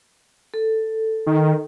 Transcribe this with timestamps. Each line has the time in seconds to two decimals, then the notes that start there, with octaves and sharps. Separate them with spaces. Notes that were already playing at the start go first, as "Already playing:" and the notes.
0.54 A4
1.27 D#3